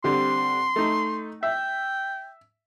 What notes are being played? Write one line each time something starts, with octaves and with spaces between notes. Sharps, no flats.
D3 G3 C4 C6
A3 D#4
E5 G5